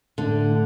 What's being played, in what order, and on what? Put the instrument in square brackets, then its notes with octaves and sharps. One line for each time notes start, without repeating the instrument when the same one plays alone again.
[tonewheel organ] A2 A3 [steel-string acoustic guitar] D3